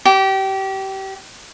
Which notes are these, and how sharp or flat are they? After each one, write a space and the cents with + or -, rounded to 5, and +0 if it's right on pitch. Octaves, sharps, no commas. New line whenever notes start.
G4 -25